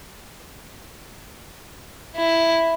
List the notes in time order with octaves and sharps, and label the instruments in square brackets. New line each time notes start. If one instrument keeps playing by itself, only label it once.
[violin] E4